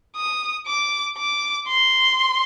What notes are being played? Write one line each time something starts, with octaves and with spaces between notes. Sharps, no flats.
D#6
D6
D6
C6